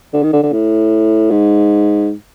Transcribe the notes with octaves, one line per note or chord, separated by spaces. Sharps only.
D3
D#3
D3
D3
A2
G#2